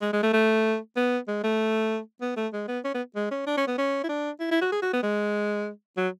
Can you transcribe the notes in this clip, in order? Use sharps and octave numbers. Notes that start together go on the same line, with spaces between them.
G#3
G#3
A3
A3
B3
G#3
A3
B3
A3
G#3
B3
C#4
B3
G#3
C#4
D4
C#4
B3
C#4
E4
D4
E4
E4
F#4
G#4
F#4
B3
G#3
F#3